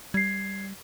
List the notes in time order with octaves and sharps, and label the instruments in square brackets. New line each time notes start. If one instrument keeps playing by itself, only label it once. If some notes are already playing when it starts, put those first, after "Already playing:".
[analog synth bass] G3 [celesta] G#6 C7